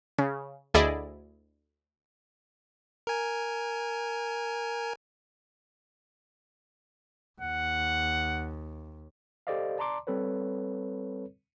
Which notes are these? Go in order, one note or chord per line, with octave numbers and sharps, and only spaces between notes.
C#3
D2 E4 G#4 D5 D#5
A#4 G#5
D#2 F#5
G4 A4 C5 D5 D#5 F5
D5 A5 A#5 C6 D6
G3 C4 A4 B4 C#5